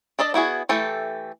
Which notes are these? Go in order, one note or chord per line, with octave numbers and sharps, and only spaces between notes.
D4 A4 D5 D#5
B3 E4 F#4 G#4
E3 A3 G4 A4